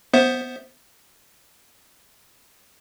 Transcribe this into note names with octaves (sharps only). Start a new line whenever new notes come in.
B3 C5 E5